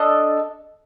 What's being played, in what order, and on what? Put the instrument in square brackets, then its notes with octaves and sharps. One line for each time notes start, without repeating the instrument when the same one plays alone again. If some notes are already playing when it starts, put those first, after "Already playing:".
Already playing: [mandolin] D4 A4 D#5